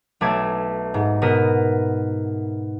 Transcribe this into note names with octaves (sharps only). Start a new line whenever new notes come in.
B1 A3 D6 G#6 E7
G#2
B2 B3 A#4 D#7